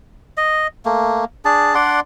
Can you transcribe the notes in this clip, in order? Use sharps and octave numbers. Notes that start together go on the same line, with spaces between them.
D#5
A3 A#3
D4 G#4 A5
D4 D5 F#5 C6